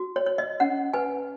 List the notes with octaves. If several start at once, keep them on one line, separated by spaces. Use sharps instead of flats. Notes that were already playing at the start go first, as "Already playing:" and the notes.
Already playing: F#4
C#5
C#5
D#5
C#4 F#5
B4 G#5